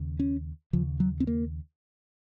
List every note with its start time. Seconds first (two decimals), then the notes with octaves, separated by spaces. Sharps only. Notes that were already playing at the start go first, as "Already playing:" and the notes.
Already playing: D#2 C#3
0.20 C#4
0.73 D#2 C#3 F3
1.00 F#3
1.20 C4
1.27 A#3